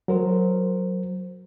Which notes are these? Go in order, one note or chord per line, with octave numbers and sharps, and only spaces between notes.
F#3 A#4 C5